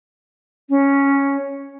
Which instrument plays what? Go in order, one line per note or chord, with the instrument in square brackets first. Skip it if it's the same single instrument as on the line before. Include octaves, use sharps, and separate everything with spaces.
[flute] C#4